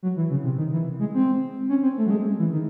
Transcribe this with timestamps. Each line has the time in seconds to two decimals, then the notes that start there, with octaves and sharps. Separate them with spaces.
0.03 F#3
0.17 E3
0.30 C#3
0.44 C3
0.58 D#3
0.72 E3
0.99 G#3
1.14 C4
1.69 C#4
1.83 C4
1.98 A3
2.06 F#3
2.11 G#3
2.39 E3
2.53 D#3